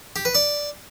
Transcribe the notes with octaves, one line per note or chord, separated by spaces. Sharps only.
G4
B4
D5